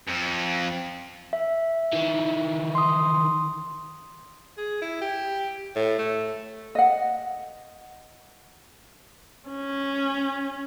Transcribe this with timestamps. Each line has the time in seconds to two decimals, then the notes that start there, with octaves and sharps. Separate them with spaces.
0.08 F2
1.33 E5
1.93 D#3 E3
2.75 C6 D#6
4.57 G#4
4.82 E4
5.01 G4
5.76 A2
5.99 A3
6.75 D#5 F#5
9.50 C#4